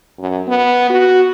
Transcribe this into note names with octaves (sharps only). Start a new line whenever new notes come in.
F#2
B3
F#4